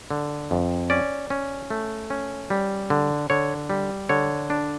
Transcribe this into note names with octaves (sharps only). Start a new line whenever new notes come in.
D3
F2
C#4 D5
C#4
A3
C#4
G3
D3
D3 C#5
G3
D3 C#5
D4